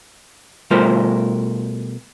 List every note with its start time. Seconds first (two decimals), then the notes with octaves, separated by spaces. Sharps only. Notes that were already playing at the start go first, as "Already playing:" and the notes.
0.71 B2 G3 A3 F4 A#4 C5